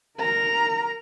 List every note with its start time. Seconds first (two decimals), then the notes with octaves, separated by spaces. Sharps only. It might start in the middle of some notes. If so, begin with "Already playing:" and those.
0.18 A#4 A#5